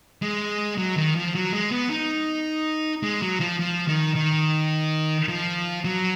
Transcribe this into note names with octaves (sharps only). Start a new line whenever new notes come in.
G#3
F#3
D#3
F3
F#3
G#3
B3
D#4
G#3
F#3
F3
F3
D#3
D#3
F3
F#3